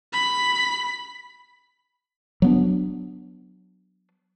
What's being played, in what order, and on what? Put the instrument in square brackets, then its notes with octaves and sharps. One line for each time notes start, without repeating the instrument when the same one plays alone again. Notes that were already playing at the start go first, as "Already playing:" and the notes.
[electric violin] B5 B6
[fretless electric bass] F#3 B3 D4